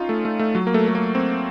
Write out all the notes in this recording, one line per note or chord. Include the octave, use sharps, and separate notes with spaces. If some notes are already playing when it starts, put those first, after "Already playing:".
Already playing: C#4 D#4 F4
A3
A3
A3
F#3
A#3
A3
A3
A#3
C4